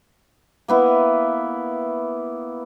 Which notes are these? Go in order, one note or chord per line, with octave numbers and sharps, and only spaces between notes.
A#3 B3 E4